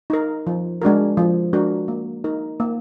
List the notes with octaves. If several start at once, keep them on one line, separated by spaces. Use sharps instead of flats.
D#4 A#4
F3
G#3 D4 F#4 A#4
F3
G#3 D4 F#4 A#4
A#3
D#4 A#4
A#3